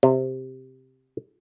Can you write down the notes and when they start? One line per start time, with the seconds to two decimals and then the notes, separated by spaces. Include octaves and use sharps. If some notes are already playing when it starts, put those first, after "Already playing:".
0.03 C3